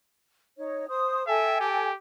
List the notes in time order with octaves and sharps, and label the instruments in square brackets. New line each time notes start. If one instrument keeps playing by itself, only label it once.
[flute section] D#4 C#5
C5 D#6
[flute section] A4 G5 G#5 [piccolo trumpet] E5
[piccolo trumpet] G4